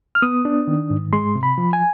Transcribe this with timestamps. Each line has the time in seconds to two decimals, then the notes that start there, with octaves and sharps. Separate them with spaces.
0.15 F6
0.22 B3 D#6
0.45 D4
0.67 D#3
0.90 G#2
1.13 G#3 C6
1.35 C3
1.43 B5
1.58 F3
1.73 G#5